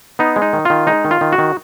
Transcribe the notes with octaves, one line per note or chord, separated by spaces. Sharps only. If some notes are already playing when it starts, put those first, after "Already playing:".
B3 D#4
G#3
D#4
D#3
D#3 F4
G#3 D#4
D#3
F4
D#3
F#4
D#3